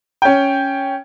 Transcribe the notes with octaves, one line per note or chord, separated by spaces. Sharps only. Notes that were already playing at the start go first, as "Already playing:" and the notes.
C#4 G5